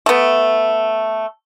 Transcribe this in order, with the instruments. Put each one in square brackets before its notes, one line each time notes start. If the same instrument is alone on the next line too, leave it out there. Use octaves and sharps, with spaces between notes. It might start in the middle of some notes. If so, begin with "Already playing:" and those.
[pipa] A3 B3